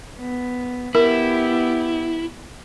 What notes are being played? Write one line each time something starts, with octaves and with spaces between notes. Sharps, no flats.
B3
B3 E4 G4 A#4